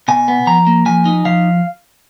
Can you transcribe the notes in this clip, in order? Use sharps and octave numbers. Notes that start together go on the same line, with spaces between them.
B2 G#5
B3
F3 A#5
A#3
F3 G#5
D#4
F3 F5